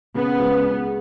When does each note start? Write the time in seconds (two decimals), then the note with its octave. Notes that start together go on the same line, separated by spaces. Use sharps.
0.15 C#3 B3
0.39 C#2
0.62 G#3